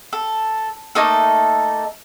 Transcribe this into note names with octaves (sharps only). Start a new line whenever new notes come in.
A4
A3 A#3 D#4 A4